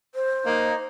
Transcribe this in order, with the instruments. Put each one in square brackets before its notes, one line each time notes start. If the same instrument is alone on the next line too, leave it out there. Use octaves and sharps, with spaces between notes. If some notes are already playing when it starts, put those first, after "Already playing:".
[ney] C5
[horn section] A#3 D#4